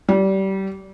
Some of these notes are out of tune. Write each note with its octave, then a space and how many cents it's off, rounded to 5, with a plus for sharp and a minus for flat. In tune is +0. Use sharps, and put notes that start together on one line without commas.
G3 -25